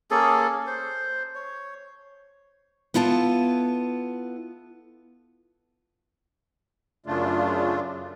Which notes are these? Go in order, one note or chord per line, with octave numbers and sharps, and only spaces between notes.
A#3 C#4 G#4 A4
C5
C#5
B3 E4 F4 A4 A5
F#2 C#3 A3 D4 F4